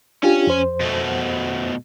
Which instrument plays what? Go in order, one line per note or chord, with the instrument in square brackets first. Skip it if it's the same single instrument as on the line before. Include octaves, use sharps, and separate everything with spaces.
[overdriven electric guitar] C#4 G#5 [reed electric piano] D4 F4 G4
[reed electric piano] F2 C5
[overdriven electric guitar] B2 A3